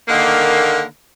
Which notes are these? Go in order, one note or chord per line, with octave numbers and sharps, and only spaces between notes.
D3 D#3 A#3